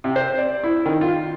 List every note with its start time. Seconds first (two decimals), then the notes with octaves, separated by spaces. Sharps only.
0.04 C3
0.16 C5
0.38 D5
0.64 E4
0.86 D#3
1.01 F4